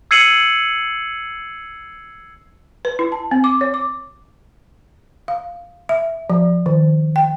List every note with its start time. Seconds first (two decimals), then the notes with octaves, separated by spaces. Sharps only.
0.11 E6 G#6 C7 C#7 D#7 F#7
2.85 B4
2.99 E4
3.12 A5
3.31 C4
3.44 D6
3.61 C#5
3.74 D6
5.28 F5
5.89 E5
6.30 F3
6.66 D#3
7.16 G5